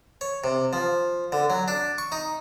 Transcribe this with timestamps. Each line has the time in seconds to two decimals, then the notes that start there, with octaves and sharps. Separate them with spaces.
0.21 C#5
0.44 C3
0.73 F3
1.32 D3
1.50 F#3
1.68 D4
1.98 C#6
2.12 D#4